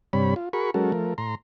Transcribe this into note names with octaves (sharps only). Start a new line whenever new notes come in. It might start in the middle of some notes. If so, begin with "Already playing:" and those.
G2 C3 G3 C#5 B5
F4
F#4 G#4 A#4 B5 C#6
F#3 G#3 C#4 F#4 A4 A#4
F3 A3 A#4
A2 A#5 C6